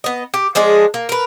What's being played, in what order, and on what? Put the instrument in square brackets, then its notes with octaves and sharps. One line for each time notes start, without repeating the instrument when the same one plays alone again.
[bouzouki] B3 D#5
G4
F3 G#3 D4 G#4
A#3
A#4 B4